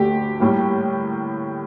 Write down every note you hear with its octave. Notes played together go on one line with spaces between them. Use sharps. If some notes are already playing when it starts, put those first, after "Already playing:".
Already playing: D2 D3 A3 G4
A2 G3 A#3